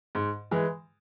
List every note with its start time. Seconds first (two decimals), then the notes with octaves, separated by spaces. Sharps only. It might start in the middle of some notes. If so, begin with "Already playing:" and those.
0.15 G#2
0.51 E3 G#3